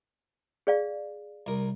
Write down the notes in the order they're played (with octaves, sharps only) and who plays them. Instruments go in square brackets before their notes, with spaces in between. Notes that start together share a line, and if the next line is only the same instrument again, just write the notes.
[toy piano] G#4 D5 F5
[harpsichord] C2 A#4